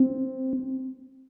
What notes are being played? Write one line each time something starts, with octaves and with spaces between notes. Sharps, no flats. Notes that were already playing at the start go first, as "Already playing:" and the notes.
Already playing: C4